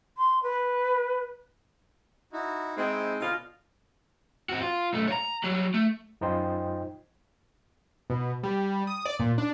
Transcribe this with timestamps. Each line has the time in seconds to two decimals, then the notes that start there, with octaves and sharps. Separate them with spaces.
0.17 C6
0.43 B4
2.33 D#4 E4 F#4
2.77 G#3 C4 D#4 E4 C5
3.20 B2 D3 F4 D#5
4.49 C4 F#4
4.62 F4
4.93 B1 A3
5.08 C#5 A#5
5.44 F#3 G3
5.74 A3
6.21 F#2 D#4 F4 C5 D#5 G5
8.10 B2
8.43 G3
8.87 D#6
9.06 D5
9.19 A#2
9.38 D4